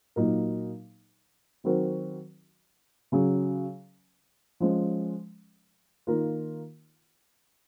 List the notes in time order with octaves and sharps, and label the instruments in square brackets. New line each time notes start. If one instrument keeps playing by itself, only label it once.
[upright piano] A#2 F#3 A#3 D#4 A#4
D#3 F#3 C4 F#4 A#4
C#3 F#3 C#4 G#4
F3 G#3 C#4
D#3 A#3 F4 A#4